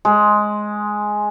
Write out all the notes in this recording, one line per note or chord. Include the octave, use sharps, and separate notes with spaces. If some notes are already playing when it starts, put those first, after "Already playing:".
G#3